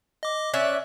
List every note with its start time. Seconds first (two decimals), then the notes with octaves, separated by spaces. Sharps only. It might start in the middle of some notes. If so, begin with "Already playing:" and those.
0.23 D#5 D6
0.54 C#4 D5 E5 F#6